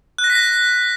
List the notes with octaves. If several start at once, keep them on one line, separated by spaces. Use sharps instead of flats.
F#6
A#6
B6
A#6